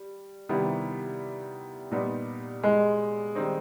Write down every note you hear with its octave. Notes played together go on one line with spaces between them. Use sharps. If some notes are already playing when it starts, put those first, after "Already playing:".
Already playing: G3
C3 D#3 G3 B3 E4
A#2 G3 B3 D#4
G#3
D#3 G3 C4 D#4